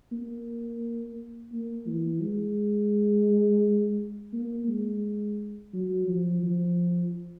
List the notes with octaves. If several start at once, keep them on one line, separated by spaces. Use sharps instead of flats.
A#3
A#3
E3
G#3
A#3
G#3
F#3
F3
F3